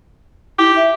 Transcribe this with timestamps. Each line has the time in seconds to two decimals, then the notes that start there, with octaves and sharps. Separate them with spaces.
0.59 E4 G4
0.76 E5